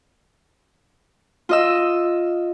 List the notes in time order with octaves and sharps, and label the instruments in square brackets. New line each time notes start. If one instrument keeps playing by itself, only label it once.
[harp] F4 D#5 E6